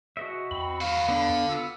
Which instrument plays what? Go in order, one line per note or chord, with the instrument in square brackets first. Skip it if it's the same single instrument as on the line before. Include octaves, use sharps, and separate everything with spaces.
[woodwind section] E2 B2 [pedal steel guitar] F#4 D#5 E5
[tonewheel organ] E2 B5 [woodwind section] C4
[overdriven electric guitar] D#3 F#4 [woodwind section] F5
[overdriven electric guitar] D3 [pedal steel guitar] B3 D4
[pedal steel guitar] B3 F4 [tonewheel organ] E6